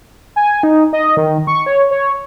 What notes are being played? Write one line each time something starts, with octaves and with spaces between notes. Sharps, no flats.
G#5
D#4
D#5
D#3
C#6
C#5
C#5